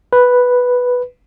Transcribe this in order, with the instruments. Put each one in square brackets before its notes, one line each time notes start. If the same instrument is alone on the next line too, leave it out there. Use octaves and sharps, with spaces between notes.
[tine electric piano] B4